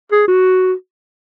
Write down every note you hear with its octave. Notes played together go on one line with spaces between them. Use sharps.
G#4
F#4